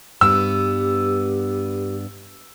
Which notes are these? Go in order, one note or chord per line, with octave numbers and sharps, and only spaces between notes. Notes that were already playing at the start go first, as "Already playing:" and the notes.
G2 B3 G4 E6